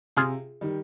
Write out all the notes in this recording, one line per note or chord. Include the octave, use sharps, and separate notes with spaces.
C3 F4 G#4
D#3 G3